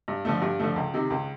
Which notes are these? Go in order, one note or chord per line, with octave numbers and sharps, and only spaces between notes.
G2
D3 F3 A3
G2
D3 F3 A3
C#2
C3 D#3
C#2